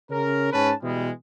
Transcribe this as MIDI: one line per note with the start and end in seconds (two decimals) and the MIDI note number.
0.10 0.50 49
0.10 0.50 61
0.10 0.50 70
0.53 0.72 44
0.53 0.72 61
0.53 0.72 71
0.53 0.72 81
0.82 1.10 47
0.82 1.10 52
0.82 1.10 55
0.82 1.10 56